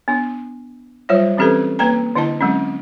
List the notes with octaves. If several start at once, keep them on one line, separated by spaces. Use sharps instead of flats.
B3 D4
F#3 G3 F4 C5 C#5
E3 C4 C#4 G4 A4 B4
A#3 B4 G5 A#5
D3 D4 E4 D#5 A5
F#3 G#3 C4 C#4